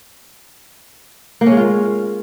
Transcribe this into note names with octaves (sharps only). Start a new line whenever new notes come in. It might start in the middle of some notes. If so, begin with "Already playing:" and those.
A#3
C#4
G#3
F4